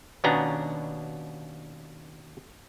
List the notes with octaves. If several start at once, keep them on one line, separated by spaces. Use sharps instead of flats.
D#2 B2 B3 C#4 D4 A#5